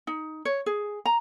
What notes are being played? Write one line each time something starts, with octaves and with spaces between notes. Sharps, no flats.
D#4
C#5
G#4
A#5